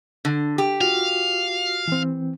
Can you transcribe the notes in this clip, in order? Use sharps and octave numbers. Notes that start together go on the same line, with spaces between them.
D3
G4
F4 F#4 F5
E3 C4